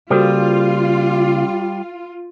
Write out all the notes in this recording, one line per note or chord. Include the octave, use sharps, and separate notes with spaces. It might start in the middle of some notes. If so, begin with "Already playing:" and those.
C#3 G3 A#3 F4 F#4 A4 C5